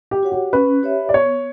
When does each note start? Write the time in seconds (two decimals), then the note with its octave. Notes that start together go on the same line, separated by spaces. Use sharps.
0.11 G4
0.23 F#4 C#5 F#5
0.32 G4
0.53 C#4 B4
0.83 G4 C#5 E5
1.09 D5
1.14 B3 C#5